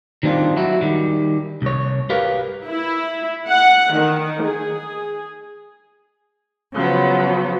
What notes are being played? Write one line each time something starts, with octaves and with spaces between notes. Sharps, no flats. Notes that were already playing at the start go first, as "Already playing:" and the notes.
D#3 G3 C4 D4 F4
F#3 E4 F#4
D#3 G3
C2 C#5
G4 A#4 B4 F5
E4
F#5
D#3
G#4
C#3 F3 F#3 B3